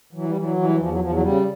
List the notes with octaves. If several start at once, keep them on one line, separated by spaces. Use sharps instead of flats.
E3 F#3
G3
E3 F#3
E3
G3
F#3
E2 F3
F#3
E2 F3
F#3
C#3 G3